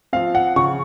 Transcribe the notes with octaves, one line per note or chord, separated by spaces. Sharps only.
F3 C4 F5
F#5
C#3 C#6